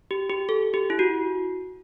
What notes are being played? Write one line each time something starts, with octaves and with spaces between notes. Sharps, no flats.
G4
G4
A4
G4
E4
F#4